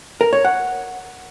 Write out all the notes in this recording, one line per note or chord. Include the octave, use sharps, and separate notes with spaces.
A#4
C#5
F#5